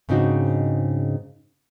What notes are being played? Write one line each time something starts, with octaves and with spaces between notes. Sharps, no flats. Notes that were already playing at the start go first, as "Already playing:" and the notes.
G#2 C#3 C4 D4 D#4 F#4